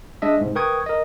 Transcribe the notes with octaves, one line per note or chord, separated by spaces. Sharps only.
G#3 D4 D#5 E5
G#2 C3
A#4 B4 G5 C#6 D#6 G#6
A#4 D#5